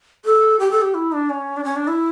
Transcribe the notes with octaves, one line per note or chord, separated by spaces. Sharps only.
A4
G4
A4
G4
E4
D4
C#4
D4
C#4
D4
E4